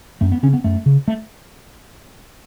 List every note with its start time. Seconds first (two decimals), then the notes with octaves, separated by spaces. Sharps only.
0.21 F#2 A3
0.32 B3
0.43 C#3 C#4
0.53 B3
0.64 F#2 A3
0.86 C#3
1.08 A3